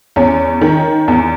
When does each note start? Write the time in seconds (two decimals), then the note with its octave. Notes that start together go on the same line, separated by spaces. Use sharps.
0.16 E2 C#4
0.61 D#3
1.08 E2